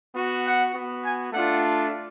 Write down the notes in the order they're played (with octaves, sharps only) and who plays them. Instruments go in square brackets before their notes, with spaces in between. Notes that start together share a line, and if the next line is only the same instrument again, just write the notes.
[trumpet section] B3 F#4
F#5
B3 F#4
G#5
A3 D4 F4 F#5